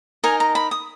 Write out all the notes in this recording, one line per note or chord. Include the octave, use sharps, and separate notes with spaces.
D#4 A#4 D#5 G#5
A#5
B5
D#6